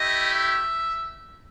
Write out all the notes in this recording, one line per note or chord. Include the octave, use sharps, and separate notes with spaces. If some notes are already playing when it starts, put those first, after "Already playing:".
Already playing: A3 E4 G4 D#5
E5